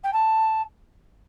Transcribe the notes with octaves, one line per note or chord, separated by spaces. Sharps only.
G5
A5